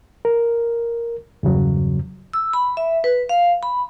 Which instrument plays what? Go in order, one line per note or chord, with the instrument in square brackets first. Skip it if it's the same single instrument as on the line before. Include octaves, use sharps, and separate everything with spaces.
[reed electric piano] A#4
E2 G2 C#3 F#3
[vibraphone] E6
B5
E5
B4
F5
B5